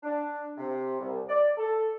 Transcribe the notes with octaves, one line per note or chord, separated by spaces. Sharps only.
D4
C3
C2
D5
A4